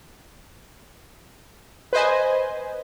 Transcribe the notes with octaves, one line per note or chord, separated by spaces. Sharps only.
B4 C5 D#5 G#5